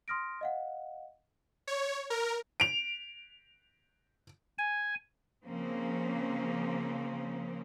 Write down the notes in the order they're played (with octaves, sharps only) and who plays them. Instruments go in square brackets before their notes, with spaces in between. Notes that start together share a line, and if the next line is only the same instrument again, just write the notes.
[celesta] C6 D#6 F6 A#6 D7
D#5 F5 F#5
[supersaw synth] C#5
A#4
[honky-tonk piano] D7 F7
[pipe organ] G#5
[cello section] C#3 F3 A#3 C4 C#4